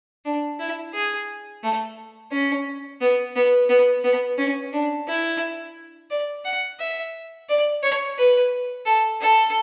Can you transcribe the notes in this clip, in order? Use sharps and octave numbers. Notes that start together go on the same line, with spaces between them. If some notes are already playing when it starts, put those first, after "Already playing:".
D4
E4
G#4
A3
C#4
B3
B3
B3
B3
C#4
D4
E4
D5
F#5
E5
D5
C#5
B4
A4
A4